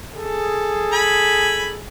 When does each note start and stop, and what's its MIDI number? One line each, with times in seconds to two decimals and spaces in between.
0.14 1.82 68
0.14 1.82 69
0.93 1.72 80
0.93 1.72 83